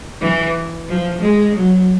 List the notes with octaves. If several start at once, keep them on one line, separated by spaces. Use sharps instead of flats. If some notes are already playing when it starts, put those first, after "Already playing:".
E3
F3
G#3
F#3